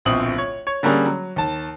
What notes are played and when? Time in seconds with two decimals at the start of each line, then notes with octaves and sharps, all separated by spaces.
0.05 D1 A#1 B2 C4 D#6 F#7
0.38 C#5
0.67 C#5
0.83 D3 G3 A#3 C#4 G#4
1.06 F#3
1.36 D#2 A5